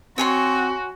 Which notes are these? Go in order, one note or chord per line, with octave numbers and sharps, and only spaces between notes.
C4 F#4 C#5 G#5 C6